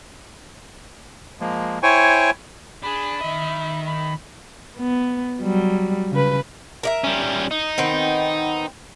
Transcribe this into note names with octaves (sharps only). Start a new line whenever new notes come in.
F3 G#3 A#3
E4 C5 C#5 G5 G#5 C#6
D4 G#4 B5
D#3 D#5 E5
B5
B3
F#3 G3
C#3 B4
A#4 D5 E5
G3 C#4
D#4
D#3 B3 C4